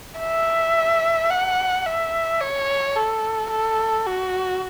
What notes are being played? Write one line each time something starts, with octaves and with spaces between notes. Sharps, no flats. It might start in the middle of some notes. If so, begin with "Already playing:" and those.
E5
F#5
E5
C#5
A4
A4
F#4